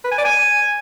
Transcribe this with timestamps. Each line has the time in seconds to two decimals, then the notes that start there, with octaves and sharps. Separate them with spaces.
0.04 B4
0.11 G#5
0.18 D5
0.25 G#5